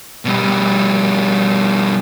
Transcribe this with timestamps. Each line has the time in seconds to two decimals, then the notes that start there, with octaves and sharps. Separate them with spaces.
0.25 B2 G3